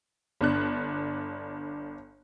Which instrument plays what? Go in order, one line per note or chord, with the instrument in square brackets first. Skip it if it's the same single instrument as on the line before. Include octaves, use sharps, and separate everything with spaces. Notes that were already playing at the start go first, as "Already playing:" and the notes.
[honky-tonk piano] G1 D4 F#6